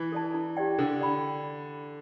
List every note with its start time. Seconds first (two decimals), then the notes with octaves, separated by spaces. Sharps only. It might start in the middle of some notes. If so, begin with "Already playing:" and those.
Already playing: E3
0.12 A4 D5 A5
0.34 E4
0.57 G4 D5 G5
0.78 D3 A4
1.01 D5 G5 B5